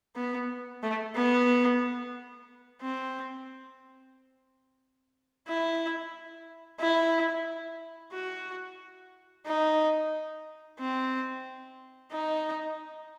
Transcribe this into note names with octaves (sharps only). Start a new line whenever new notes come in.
B3
A3
B3
C4
E4
E4
F#4
D#4
C4
D#4